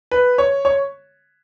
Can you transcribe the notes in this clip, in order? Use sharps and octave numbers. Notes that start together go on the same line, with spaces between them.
B4
C#5
C#5